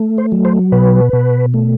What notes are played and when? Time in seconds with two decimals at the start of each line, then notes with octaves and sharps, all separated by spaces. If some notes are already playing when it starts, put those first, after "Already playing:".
Already playing: A3
0.18 C5
0.32 F#3
0.45 C5
0.72 B2 B4
1.13 B2
1.54 A3